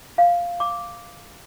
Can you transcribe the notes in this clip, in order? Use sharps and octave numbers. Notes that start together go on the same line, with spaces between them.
F5
D6